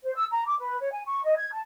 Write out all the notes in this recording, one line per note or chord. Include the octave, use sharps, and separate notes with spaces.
C5
E6
A#5
D6
B4
C#5
G#5
C#6
D#5
G#6
A5